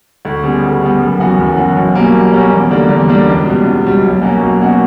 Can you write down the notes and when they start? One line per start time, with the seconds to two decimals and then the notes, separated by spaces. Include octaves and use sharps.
0.25 D2
0.44 C#3 G3 B3
0.63 D2
0.81 C#3 G3 B3
1.01 F#1
1.20 F#2 E3 B3 F#4
1.39 F#1
1.57 F#2 E3 B3 F#4
1.76 B1
1.95 B2 G3 A#3 C#4
2.15 B1
2.32 B2 G3 A#3 C#4
2.52 E2
2.70 D3 G3 A#3 D4
2.89 E2
3.09 D3 G3 A#3 D4
3.27 C#2
3.46 B2 G3
3.65 C#2
3.84 B2 G3
4.03 B1
4.22 B2 A#3 C#4 F#4
4.41 B1
4.60 B2 A#3 C#4 F#4